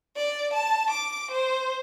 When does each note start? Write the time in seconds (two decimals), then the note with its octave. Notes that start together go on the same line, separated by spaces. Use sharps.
0.16 D5
0.53 A5
0.90 D6
1.31 C5